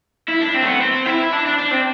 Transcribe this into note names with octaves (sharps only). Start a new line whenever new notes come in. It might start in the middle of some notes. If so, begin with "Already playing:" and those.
E4
D4
C4
A3
B3
C4
E4
D4
D4
D4
C4